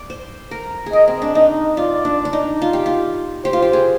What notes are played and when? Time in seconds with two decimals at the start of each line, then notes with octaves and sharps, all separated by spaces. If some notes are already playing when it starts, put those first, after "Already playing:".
Already playing: D5
0.10 C5
0.51 A#4
0.86 G#4
0.93 A#4 D#5
1.08 C4
1.22 D4
1.35 D#4 D#5
1.77 F4 D5
2.05 D4
2.25 D4
2.33 D#4
2.62 F4
2.73 G4
2.86 F4
3.45 G4 C5
3.53 F4
3.62 G4
3.73 G#4